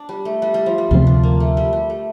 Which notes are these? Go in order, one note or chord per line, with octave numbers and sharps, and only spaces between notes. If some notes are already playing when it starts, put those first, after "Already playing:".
Already playing: D4
G3
A3
G3
G3
F3
G3
D2 C3 F3 C4 F4
D4
A#3
A3
G3
G3
A3